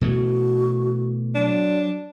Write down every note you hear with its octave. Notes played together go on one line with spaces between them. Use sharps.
B2 E3 A3 F#4
F#3 D4